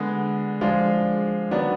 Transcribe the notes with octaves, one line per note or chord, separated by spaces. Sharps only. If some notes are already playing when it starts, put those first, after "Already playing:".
Already playing: D3 G#3 B3
F3 G#3 D4 F4
D#3 F#3 B3 D4